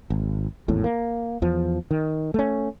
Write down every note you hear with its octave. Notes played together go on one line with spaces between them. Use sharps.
G#1
G#1 E2 A2
A#3
E2 F3
D#3
A3 C#4